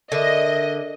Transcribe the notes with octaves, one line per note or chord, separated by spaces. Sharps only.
D3 A#4 D#5 E5